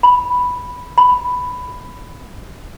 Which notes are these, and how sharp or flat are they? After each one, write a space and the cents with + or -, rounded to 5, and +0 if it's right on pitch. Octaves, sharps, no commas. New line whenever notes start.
B5 +0
B5 +10